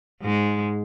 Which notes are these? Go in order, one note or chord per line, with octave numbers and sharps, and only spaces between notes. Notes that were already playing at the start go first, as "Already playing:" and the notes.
G#2 G#3